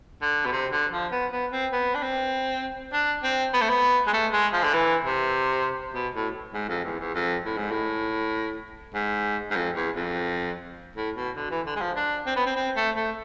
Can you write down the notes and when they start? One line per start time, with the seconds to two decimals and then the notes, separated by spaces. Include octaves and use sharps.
0.22 D3
0.45 B2
0.52 C3
0.72 D3
0.92 F3
1.12 B3
1.32 B3
1.52 C4
1.72 B3
1.95 D4
2.02 C4
2.93 D4
3.23 C4
3.53 B3
3.62 A3
3.69 B3
4.07 G#3
4.13 A3
4.33 G#3
4.53 F3
4.63 D3
4.74 E3
5.04 C3
5.94 B2
6.14 A2
6.54 G#2
6.69 F2
6.84 E2
6.99 E2
7.15 F2
7.44 A2
7.58 G#2
7.71 A2
8.94 G#2
9.51 G#2
9.55 F2
9.76 E2
9.95 F2
10.96 A2
11.16 B2
11.36 D3
11.51 E3
11.66 D3
11.76 G#3
11.81 F3
11.96 D4
12.27 C4
12.36 B3
12.46 C4
12.56 C4
12.76 A3
12.96 A3